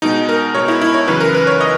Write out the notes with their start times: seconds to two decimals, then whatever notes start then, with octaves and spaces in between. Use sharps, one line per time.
0.02 B2 G#3 D#4
0.29 A#4
0.54 B2 G#3 C#5
0.68 E4
0.82 E4
0.94 C#5
1.08 F#2 C#3 E3 B4
1.20 A#4
1.35 B4
1.47 C#5
1.61 D#5